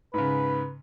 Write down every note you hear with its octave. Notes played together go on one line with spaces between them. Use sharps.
G#2 C#3 B4